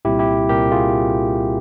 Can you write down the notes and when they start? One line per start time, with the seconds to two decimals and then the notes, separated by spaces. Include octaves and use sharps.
0.05 C2 A#2 G3 C4 E4 G4
0.19 E4 G4
0.49 C2 A#2 G3 C4 G4 A#4
0.72 F4 G#4